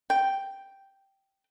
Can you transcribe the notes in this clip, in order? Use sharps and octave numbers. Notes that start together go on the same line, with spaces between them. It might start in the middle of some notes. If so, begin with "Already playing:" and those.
G5